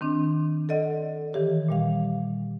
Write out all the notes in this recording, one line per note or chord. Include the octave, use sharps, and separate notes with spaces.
D#3 C4 D4
A4 D5 D#5 F#5
D#3 E3 G4 C#5
A#2 G3 F5